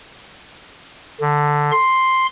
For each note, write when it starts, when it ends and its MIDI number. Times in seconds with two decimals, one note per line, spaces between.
1.21 1.71 50
1.72 2.26 84